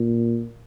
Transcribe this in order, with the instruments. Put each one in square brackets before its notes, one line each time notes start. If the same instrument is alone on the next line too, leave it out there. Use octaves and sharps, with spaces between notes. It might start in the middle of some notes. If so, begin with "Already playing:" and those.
Already playing: [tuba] A#2